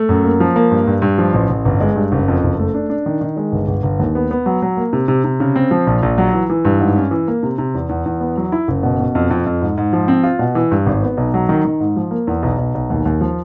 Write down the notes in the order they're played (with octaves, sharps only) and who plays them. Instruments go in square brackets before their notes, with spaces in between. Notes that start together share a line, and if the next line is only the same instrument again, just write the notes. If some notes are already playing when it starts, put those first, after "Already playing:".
Already playing: [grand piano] A3
F#2
A#3
F3
A#3
G2
G2
G2
F3
A1
A1
G1
G#3
G2
F#1
F2
F#1
A3
D4
D4
D#3
D#3
G#3
G1
G1
G1
D#2
B3
B3
F#3
F#3
A#3
C3
C3
C3
C#3
C4
F3
A#1
A#1
F#3
E3
E3
G2
G#2
C#4
E3
A#3
C3
C3
E2
E2
E2
B3
F#3
E4
F#1
B2
B2
F2
F2
F2
G#2
G#2
F3
C4
F4
B2
E3
G2
G#1
B3
B1
F#3
D#3
D#3
G#2
F3
A#3
E2
B1
B1
B1
D#2
D#2
F3